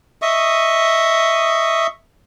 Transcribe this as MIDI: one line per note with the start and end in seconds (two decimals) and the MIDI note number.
0.22 1.87 75
0.22 1.87 76
0.22 1.87 85
0.22 1.87 87